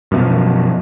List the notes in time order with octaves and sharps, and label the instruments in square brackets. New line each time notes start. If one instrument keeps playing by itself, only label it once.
[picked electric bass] F#2 B2 F3